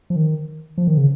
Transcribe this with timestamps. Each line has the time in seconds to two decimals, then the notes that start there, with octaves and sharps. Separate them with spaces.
0.10 F3
0.16 D#3
0.78 F3
0.87 D#3
0.97 C#3